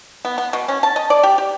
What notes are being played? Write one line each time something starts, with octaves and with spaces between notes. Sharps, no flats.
B3
B3
B2
C#4
A5
D#5
D5
G4
G4